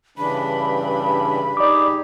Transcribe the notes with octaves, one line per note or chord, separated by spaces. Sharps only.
G2 C#3 E3 D4 B5
D#4 G4 G#4 D5 D6